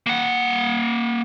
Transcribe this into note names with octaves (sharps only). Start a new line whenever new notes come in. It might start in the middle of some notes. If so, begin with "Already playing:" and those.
A#3 F#5